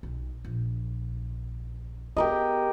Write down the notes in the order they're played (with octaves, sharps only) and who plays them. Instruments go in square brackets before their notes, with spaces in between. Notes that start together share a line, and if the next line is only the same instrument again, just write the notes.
[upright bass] B1
A#1
[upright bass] B3 [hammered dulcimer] G4 A#4 D#5